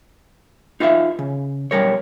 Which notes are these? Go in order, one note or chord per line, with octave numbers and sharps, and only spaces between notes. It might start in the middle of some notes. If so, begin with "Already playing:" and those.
D#4 F4 B4 E5
C#3
B1 G2 G3 A#4 C#5